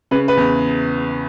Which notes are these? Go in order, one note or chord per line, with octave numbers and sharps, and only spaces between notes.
C#3 B4
B4
E2